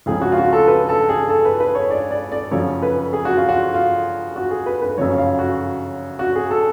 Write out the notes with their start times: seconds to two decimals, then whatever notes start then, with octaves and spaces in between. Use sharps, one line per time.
0.06 C#2 C#3 F3 G#4
0.21 F#4
0.32 F4
0.38 F#4
0.53 A4
0.68 B4
0.89 A4
1.09 G#4
1.29 A4
1.45 B4
1.60 B4
1.75 C#5
1.90 D5
2.11 D5
2.32 D5
2.51 F#2 C#3 F3 C#5
2.83 B4
3.13 G#4
3.25 F#4
3.37 F4
3.49 F#4
3.74 F4
4.36 F#4
4.51 G#4
4.66 B4
4.82 B4
4.97 F#2 C#3 F3 C#5
5.18 F5
5.39 F#4
6.19 F#4
6.35 G#4
6.50 A4